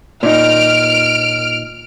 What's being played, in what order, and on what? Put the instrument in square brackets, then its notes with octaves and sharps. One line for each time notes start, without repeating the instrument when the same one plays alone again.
[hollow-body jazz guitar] A#2 D#4 [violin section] F6 D7